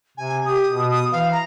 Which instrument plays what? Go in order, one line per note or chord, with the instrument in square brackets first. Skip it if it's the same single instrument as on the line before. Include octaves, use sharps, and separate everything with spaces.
[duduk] C3 [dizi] G#5
[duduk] G4 [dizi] D#6
[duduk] B2
[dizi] D#6
[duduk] E3 [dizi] F5
[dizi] A#5